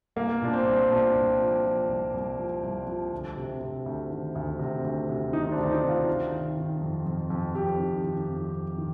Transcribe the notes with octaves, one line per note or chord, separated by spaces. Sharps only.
C2 A#3
A#2 D4
C4
C2
A#2 D4
C2
F3
F3
C2
C2
F3
C2
F3
D2
C3
C3
D2
D#3
D2
C3
D2
C3
D#3 D#4
C4
D4
D2
D4
D#4
C3
F4
D#3
D#3
D#3
F2
F2
F2
F2 G4
D#3
D#3
F2
F2
D#3